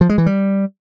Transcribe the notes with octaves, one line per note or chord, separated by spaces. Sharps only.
F3
G#3
E3
G3